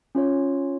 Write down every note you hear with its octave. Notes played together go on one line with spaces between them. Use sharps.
C#4 F4 C#5